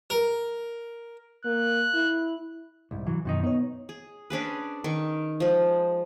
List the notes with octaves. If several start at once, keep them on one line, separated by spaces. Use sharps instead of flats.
A#4
A#3 F#6
E4
C2 G#2
E3 F#3
F#2 B2 D#3 D#4
B3 D#4 C#5
G#4
C#4 D4 G#4 B4
D#3 C#6
F3 G#3